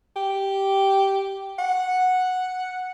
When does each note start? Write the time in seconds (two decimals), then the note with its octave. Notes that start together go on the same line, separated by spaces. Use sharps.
0.16 G4
1.59 F#5